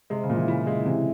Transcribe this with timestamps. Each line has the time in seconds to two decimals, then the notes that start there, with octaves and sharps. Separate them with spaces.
0.10 C3 G#3
0.23 C#3
0.30 A#2
0.35 E3
0.48 C#3 E4
0.67 G#3
0.85 C3 E3